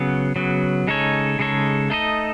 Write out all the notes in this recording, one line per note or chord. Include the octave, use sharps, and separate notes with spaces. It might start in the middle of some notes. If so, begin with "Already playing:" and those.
Already playing: C#3 F#3 B3
C#3 F#3 B3
C#3 G#3 D#4 A4 C#5
C#3 G#3 D#4 A4 C#5
A3 D#4 A4 D#5